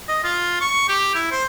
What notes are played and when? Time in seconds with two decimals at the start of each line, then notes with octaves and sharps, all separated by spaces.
0.09 D#5
0.24 F4
0.61 C#6
0.89 G4
1.15 E4
1.32 C5